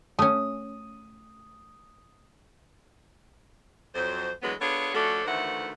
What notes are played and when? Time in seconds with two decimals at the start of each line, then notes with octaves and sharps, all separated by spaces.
0.19 A3 C#4 D#6
3.95 F2 F#3 C5
4.43 D2 E3 F#3 G#3 B3 B4
4.60 B3 D4 F4 G#4 A4 C#5
4.94 F3 A3 C#4 D4 F#4 A4
5.25 D2 D#3 E3 A3 C5 F#5